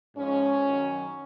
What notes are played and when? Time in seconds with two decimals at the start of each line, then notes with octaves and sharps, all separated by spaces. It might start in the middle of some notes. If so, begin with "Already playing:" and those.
0.16 G#2 F3 G#3 C#4
0.64 F#2 D#3 F#3